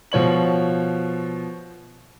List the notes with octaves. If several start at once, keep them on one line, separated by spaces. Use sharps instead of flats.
B2 F3 C#5 F#7